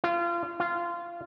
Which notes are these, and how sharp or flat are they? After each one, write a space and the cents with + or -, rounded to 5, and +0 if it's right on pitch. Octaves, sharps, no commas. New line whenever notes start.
F4 -30
F4 -20